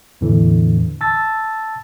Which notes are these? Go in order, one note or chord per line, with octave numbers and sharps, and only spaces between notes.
E2 A2 D3 E3
A5 E6 A6